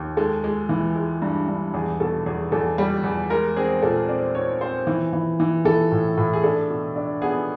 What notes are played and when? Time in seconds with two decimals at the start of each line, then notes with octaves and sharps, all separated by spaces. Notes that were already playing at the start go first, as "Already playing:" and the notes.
Already playing: D#2
0.17 G#3 A4
0.44 G#3
0.69 E3
0.96 G#3
1.22 G2
1.48 G2
1.74 E2 G#4
2.00 B2 A4
2.26 E2 G#4
2.52 E2 A4
2.78 G3
3.04 E2
3.30 G#3 A#4
3.56 C4 G#4
3.82 A#2 A4
4.09 C4 D5
4.34 C4 C#5
4.61 C4 C5
4.87 E3
5.13 E3
5.40 E3
5.65 E3 A4
5.92 A2
6.17 A2
6.33 G#4
6.43 D4 A4
6.70 B2
6.96 D4
7.22 B3 G#4